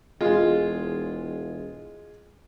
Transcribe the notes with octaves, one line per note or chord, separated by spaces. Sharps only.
E1 G#3 F4